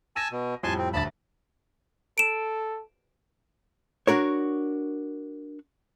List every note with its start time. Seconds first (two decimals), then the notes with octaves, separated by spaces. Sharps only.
0.16 G#5 A5 E6 A#6 D#7
0.31 B2
0.64 F2 A2 G3 G#5 A5 C6
0.78 C4
0.93 D#1 D2 A5 B5 A6
2.18 A4 D7 E7
4.07 D4 F#4 A#4 C#5